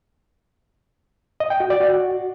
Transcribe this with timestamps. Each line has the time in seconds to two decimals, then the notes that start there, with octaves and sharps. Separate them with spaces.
1.40 D#5
1.50 G5
1.60 F#4
1.70 D5
1.80 F#4